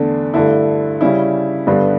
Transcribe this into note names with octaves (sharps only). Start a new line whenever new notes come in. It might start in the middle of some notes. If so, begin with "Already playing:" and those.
Already playing: E2 D3 A3 D4
G2 D3 A3 E4
C#3 G3 C#4 E4
G2 D3 G3 B3 D4